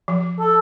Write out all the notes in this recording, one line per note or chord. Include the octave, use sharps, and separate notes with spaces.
F3
A4